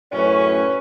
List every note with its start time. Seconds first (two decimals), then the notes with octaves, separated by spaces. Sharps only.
0.12 F#2 A2 C#4 B4 C#5